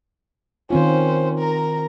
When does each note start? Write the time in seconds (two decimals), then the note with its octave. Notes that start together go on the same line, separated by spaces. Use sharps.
0.70 D#3 C4 C#4 F4 C5
1.38 A#4 A#5